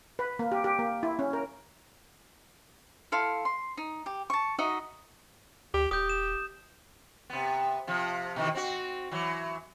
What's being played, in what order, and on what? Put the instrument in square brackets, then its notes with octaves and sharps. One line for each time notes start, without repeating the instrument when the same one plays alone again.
[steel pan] B4
A#3
G4
G4
A#3
E4
C#4
A#4
[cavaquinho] E4 A4 F5 C6
C6
D#4
G4
A5 C#6
D#4 F#4 D#5 E5
[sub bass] D2 [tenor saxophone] G4
[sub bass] D#1 [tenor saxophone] G4 [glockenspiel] D#6 G6
[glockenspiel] E7
[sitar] C3 B3
C3 F3
B2 D#3 E3
C4 F#4
E3 F#3